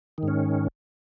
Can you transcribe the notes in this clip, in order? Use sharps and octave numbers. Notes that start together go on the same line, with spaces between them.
G#2 D#3 C#4